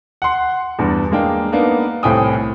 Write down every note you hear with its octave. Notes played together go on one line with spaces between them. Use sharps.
F#5 C6
E2 G2
G#3 A#3 D4 G5
A#3 B3 D4 D#4
C2 A2 C4 G5 G#5 D#6